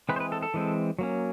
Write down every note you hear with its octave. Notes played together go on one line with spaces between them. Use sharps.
E3 G#3 C4 B4
C5
B4
A4
A4
E3 G#3 C4
F#3 A#3 C#4